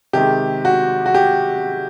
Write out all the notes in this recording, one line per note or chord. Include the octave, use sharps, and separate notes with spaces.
C3 D#3 G#3 G4
F#4
F#4
G4